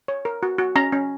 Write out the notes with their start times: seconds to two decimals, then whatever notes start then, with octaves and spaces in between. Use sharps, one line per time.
0.08 C#5
0.25 A#4
0.43 F#4
0.58 F#4
0.76 C#4 A#5
0.92 C#4